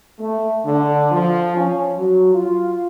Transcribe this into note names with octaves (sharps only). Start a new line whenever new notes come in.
A3
D3
F3
C#4
F#3
F4